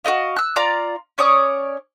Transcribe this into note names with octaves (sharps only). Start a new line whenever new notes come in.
F#4 A#4 D#5 F5
E6 F#6
F4 D5 A#5
C#4 C#5 D5 D#6